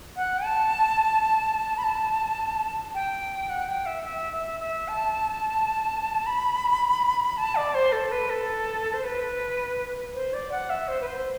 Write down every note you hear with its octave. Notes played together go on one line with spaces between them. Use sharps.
F#5
A5
B5
A5
G5
F#5
G5
E5
E5
E5
E5
A5
B5
A5
D5
C5
A4
B4
A4
C5
B4
C5
D5
F#5
E5
C5
B4
C5